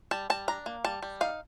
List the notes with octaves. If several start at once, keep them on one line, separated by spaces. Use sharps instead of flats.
G3 A5
G3 A5
D4 A#5
A#3
G3 A5
G3
D#4 F5